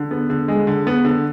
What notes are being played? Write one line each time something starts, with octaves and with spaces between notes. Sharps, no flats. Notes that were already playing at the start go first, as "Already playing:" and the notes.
Already playing: D3
B3
D3
G#3
D3
B3
D3